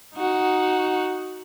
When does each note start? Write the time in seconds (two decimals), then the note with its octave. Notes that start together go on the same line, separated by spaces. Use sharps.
0.15 D#4 F#4